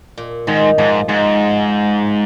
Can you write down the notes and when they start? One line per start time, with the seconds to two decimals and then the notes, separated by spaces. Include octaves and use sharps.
0.17 A#2
0.47 G#2 D#3
0.78 G#2 F3
1.08 G#2 G#3